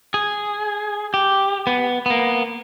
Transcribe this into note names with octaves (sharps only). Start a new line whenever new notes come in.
G#4
G4
B3
A#3 B3